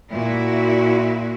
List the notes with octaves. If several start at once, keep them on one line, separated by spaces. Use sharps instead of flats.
A#2 E4 F#4